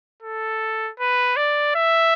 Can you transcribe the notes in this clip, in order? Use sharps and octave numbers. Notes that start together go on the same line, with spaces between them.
A4
B4
D5
E5